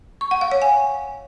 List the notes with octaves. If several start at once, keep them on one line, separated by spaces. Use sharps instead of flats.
C#6
F#5
F5
C#5
G#5